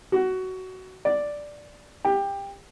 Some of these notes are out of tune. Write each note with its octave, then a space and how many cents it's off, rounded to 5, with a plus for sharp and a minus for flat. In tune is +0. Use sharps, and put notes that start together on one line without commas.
F#4 +15
D5 +0
G4 +20